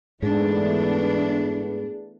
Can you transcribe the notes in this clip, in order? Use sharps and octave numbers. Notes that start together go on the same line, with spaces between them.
G#2 E3 A3 B3 D4 G#4